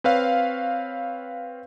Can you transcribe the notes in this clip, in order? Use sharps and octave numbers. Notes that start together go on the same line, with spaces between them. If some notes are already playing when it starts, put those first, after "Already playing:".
C4 B4 C#5 F5